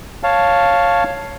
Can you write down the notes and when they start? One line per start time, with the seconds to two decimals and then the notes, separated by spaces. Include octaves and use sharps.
0.23 C#5 F5 A5